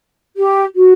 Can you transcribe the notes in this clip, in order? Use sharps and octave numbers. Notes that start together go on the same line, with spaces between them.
G4
F#4